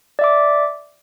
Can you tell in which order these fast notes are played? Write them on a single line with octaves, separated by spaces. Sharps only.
D5 E5 D6